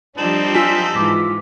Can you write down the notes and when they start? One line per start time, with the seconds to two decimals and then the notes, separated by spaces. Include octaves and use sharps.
0.18 F3 G3 C4 D4 D#4 A4 E7 F#7
0.54 F4 G#5 E6 B6
0.93 G#2 E3 D6 A#6